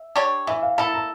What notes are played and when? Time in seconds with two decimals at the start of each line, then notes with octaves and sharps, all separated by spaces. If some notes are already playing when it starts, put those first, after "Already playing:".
Already playing: E5
0.16 D4 G4 C#5
0.47 E3 E5
0.62 F5
0.78 A#3 E4 A4 A5
0.94 A#5